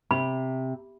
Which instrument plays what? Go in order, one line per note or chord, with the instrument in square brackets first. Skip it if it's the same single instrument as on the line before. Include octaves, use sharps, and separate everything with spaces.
[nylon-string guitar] C3 [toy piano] B5